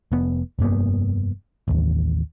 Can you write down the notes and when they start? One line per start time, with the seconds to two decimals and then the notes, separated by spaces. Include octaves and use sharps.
0.12 F1 B3
0.59 F1 G2 A#3 B3
1.68 A1 D#2